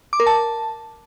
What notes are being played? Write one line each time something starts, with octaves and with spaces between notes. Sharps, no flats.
D6
A#4
A5